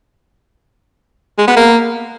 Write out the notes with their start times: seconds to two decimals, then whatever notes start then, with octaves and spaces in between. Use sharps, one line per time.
1.38 G#3
1.47 B3
1.57 A#3